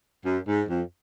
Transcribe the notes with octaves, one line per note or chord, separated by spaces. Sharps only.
F#2
G#2
F2